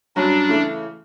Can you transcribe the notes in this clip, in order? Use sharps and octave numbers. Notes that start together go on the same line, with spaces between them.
G2 F#3 C#4 D4 F#4
C#3 E3 A3